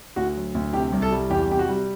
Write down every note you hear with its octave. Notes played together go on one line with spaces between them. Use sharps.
D2 F#4
F#3
D2
C3 G4
C2
A4
G3
E2 G4
C3 G4
F#4
G3